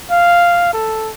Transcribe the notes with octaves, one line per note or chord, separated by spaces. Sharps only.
F5
A4